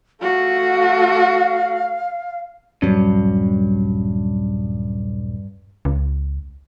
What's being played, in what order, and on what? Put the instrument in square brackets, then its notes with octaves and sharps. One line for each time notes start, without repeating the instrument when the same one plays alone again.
[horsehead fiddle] A3 F#4 [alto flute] F5
[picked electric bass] D#1 F#3 C#4 [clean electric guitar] G2
[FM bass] C#2